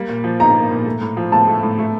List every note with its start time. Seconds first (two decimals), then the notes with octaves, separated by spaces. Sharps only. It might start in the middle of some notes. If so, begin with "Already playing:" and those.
Already playing: G3 A#3
0.09 A#2
0.24 F3
0.40 D#4 A#5
0.55 A#3
0.71 A#2
0.86 A3
1.01 A2
1.17 F3
1.32 A2 A5
1.48 A3
1.63 A2
1.79 A3